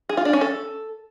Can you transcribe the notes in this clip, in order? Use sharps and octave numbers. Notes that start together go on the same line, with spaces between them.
G#4
F4
D4
C#4
A4